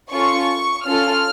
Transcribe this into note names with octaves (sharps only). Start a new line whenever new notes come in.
C#4 F4 A4 C#6
C#4 F4 A4 F6